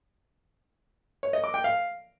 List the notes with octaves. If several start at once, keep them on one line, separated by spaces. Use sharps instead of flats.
C#5
D#5
D6
G5
F5